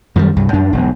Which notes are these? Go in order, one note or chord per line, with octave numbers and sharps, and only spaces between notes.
F#2 D#3 F#3 G3
C2 G2
F#2 D4
E1 B1